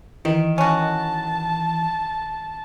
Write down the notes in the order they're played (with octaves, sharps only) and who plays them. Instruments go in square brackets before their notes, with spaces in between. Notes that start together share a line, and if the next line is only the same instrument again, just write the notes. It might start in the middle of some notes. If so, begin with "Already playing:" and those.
[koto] D#3 [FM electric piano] E3
[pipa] C#4 F#4 [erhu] A5